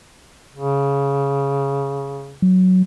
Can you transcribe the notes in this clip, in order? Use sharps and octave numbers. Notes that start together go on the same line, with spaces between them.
C#3
F#3